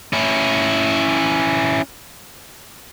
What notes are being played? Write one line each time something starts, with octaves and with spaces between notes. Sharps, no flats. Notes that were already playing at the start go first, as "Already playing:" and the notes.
C#4 E4